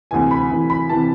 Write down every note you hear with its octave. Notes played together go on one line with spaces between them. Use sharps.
D2 C3 E3 G#5
B5
D2 C3 E3
B5
C3 E3 A5